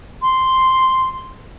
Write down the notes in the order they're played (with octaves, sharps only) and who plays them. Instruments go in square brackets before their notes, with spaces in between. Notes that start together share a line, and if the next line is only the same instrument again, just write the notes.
[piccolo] C6